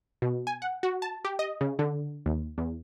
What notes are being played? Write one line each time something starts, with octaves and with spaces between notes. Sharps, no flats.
B2
G#5
F#5
F#4
A5
G4
D#5
C#3
D3
D#2
E2